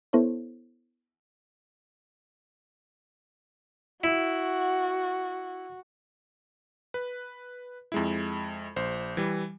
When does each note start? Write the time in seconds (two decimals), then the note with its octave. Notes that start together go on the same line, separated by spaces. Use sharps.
0.13 B3 E4 A4 C5 C#5
4.04 E4 F#4
6.94 B4
7.92 F2 G#3 E4
8.76 A#1 C5
9.17 E3 G3